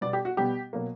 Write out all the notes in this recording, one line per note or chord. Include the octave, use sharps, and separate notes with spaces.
B2 G3 B3 D5
G4
F#4
B2 G3 B3 G4
B2 F#3 A#3